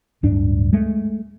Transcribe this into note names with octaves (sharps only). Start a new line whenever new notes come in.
D1 G2 D4
G#3 A3